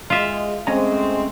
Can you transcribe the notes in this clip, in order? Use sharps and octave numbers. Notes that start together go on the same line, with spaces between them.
G#3 F4 E5
G#3 A3 C4 C#4 D#5 A#5